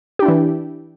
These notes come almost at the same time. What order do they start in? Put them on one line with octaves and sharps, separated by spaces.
G4 D4 E4 E3